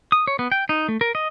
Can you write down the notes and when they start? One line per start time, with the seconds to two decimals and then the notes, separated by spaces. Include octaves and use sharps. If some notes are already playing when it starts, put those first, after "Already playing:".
0.12 D#6
0.27 C#5
0.39 B3
0.52 G5
0.69 D#4
0.88 A3
1.01 A#4
1.15 D#5